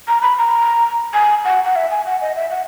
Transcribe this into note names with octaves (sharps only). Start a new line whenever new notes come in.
A#5
B5
A#5
G#5
F#5
F#5
E5
G#5
F#5
D#5
E5
F#5